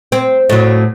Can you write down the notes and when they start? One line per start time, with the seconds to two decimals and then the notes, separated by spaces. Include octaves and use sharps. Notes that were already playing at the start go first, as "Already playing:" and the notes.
0.12 C4
0.49 A2 F#3